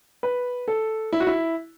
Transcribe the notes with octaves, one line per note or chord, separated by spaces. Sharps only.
B4
A4
E4
F#4
E4